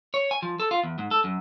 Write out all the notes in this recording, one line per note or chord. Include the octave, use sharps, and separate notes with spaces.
C#5
G#5
F3
A4
F4
E2
G#2
A4
F#2